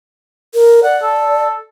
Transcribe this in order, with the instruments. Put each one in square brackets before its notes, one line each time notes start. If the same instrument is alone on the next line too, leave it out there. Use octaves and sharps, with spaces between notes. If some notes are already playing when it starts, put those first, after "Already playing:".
[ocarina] A#4
[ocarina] D5 [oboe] F#5
[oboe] A4